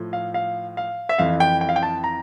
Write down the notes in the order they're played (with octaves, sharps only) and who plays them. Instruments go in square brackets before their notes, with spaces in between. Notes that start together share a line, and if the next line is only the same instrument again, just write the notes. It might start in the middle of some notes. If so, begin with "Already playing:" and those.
Already playing: [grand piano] A2 F3
F5
F5
F5
E5
F2 E3 F5
G5
G5
F5
G5
A5
A#5